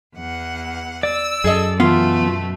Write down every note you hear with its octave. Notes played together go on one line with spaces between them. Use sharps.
E2 F#5
D5 E6
F#2 G#4 A4 D#5
B2 E3 A3 B3 F4